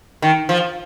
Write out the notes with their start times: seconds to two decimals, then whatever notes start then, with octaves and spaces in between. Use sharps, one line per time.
0.22 D#3
0.49 F3